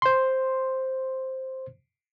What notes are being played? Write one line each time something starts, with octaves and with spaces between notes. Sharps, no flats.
C5 C6